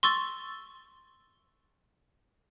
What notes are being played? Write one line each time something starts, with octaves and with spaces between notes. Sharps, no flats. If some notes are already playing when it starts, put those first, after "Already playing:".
C6 C#6 E6 A6